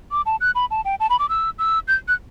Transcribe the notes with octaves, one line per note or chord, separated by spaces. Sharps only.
D6
A5
F#6
B5
A5
G5
A5
B5
D6
E6
E6
G6
F#6